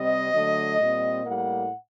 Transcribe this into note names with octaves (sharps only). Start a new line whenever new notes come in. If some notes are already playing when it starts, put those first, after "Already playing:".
Already playing: C3 G3 C4 D#5
D3 F#3 A3
A#2 G3 C4
A2 G3 A#3 F#5